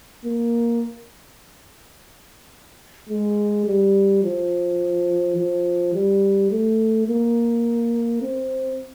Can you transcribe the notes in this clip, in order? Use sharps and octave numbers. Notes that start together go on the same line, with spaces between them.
A#3
G#3
G3
F3
F3
G3
A3
A#3
C4